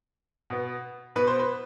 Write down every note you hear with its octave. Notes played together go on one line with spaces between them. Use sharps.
B2 B3
B2 B3 B4
C5
B4